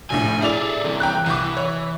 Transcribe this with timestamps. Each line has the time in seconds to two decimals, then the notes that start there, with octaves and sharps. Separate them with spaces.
0.10 F1 A#1 A2 G#5
0.42 E4 G#4 A4 D5 F7
0.84 C3 E3
1.00 G5 A#5 F#6
1.26 C2 E3 D6
1.57 C#5